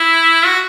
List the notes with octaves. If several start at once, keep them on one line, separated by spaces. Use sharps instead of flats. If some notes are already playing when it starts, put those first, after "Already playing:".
Already playing: E4
F#4